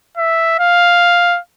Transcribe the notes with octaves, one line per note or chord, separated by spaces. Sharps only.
E5
F5